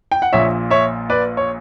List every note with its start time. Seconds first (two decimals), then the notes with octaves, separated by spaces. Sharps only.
0.12 G5
0.22 F#5
0.33 A#1 A#2 C#5 E5
0.70 C#5 E5
1.10 B4 D5
1.37 C#5